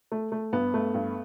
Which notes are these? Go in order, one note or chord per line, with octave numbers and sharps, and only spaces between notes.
A3
A3
G2 B3
A3
G2